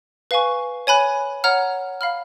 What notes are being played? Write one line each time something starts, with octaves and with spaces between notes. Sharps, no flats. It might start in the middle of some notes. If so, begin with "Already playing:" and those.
B4 F5 G#5 C#6
C#5 G#5 B5 F#6
C#5 F#5 A#5 F6
F5 B5 F6